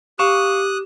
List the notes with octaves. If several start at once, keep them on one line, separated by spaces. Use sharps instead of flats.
G4 F5 C#6 D#6 F#6 E7